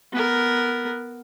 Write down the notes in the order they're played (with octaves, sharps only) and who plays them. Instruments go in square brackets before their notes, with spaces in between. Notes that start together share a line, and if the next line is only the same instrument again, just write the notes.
[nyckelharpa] B3 A#4